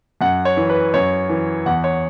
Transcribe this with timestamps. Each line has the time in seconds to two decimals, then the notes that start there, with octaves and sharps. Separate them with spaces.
0.21 F#2 F#5
0.45 C#5
0.57 E3
0.70 B4
0.94 F#2 C#5
1.29 E3
1.66 E2 F#5
1.84 C#5